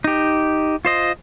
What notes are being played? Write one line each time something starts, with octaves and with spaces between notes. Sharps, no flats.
D#4 G4
F4 C5 D#5